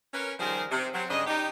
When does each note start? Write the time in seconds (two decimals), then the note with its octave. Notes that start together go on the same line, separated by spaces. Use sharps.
0.14 C#4 A#4 B4
0.39 D#3 F3 G3 G#4 A#4 C5
0.70 C3
0.94 F#3 C4
1.09 G2 C#3 D4 D#5
1.26 D#4 G4